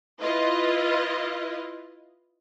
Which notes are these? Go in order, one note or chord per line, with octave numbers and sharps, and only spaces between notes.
E4 F4 B4 D#5